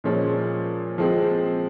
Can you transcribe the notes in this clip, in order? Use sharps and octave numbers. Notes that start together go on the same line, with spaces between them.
A#2 F3 G#3 C#4
F3 G#3 C4